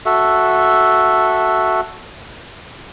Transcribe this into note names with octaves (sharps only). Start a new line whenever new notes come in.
F#4 A4 E5